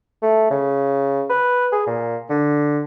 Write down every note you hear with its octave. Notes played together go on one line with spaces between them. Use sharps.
A3
C#3
B4
G#4
A#2
D3